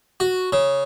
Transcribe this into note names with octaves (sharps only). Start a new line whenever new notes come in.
F#4
C#3